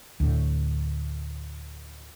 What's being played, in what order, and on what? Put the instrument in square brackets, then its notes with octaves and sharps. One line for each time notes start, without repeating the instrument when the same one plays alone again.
[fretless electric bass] D2 A2